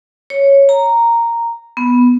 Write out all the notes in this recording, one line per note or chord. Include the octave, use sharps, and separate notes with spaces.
C#5
A#5
B3